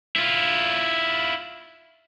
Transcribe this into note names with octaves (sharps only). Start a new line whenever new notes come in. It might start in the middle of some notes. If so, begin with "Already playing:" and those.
E4 F4